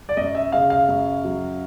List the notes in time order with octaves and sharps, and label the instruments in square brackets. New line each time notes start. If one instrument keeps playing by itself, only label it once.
[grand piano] D5
F#2 D#5
E5
C#3 F5
F5
F#2
F#3